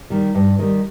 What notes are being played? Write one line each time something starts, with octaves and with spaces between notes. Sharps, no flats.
D#3 G3
G2
D#3 G3